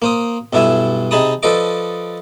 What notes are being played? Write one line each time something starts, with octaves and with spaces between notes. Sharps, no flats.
A#3 C5 D#6
B1 G2 D4 E4 E5 G#5
C3 D#4 G#4 A5 B5 D#6
F3 A4 B4 D5 D#5 D6